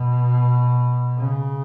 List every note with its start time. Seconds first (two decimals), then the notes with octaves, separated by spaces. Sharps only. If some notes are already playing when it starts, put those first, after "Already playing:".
Already playing: B2
1.18 C#3